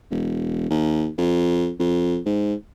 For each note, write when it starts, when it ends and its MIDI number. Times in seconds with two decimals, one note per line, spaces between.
0.11 0.68 28
0.70 1.09 39
1.18 1.71 41
1.79 2.19 41
2.26 2.54 44